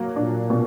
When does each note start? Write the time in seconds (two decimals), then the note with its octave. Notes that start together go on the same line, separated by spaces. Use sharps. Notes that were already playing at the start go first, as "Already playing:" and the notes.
Already playing: F#3 A#3
0.16 A#2 D4
0.50 B2